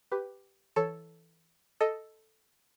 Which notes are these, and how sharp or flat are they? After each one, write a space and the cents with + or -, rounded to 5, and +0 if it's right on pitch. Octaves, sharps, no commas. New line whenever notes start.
G4 +0 B4 +5
E3 +0 A4 +0 C#5 +0
A4 +0 D#5 +5